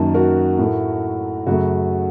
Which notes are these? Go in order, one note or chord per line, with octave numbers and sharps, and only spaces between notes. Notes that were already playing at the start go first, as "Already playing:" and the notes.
Already playing: F#2 D#3 A#3 A5
F#4 A#4
A2 A3
F#2 C#3 A3 F#4